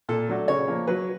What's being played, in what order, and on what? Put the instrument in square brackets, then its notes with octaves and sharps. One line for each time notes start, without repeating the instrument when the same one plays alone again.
[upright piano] A#2 [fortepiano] A4
[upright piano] F#3 A3 D4 F#4
[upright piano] C#3 [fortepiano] C#5
[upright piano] F3 A#3
[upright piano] F#3 [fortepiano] B4